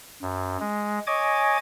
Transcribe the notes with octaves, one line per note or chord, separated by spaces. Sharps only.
F#2
G#3
C#5 D#5 G#5 D6 G#6